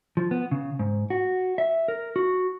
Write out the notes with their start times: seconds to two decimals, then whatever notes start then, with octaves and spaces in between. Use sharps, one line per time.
0.17 F3
0.31 B3
0.51 C#3
0.79 G#2
1.10 F#4
1.58 E5
1.88 A#4
2.16 F#4